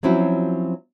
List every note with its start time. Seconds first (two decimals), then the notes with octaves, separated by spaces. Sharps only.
0.03 F3 F#3 C4 C#4 E4 F#4